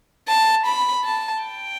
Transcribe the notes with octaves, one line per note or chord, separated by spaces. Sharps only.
A5
B5
A5
G5